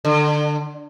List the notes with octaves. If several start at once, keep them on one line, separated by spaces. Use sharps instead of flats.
D3